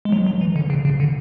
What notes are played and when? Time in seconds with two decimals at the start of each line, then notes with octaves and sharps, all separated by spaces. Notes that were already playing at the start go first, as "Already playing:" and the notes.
0.05 G#3
0.12 F#3
0.26 F#3
0.41 E3
0.56 D3
0.70 C#3
0.85 C#3
1.00 D3